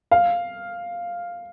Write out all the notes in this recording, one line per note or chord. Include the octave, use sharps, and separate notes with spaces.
F5